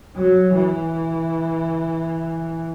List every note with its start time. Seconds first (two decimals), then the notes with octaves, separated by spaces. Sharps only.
0.16 F#3
0.55 E3